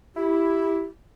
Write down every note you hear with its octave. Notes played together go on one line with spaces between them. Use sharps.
E4 G4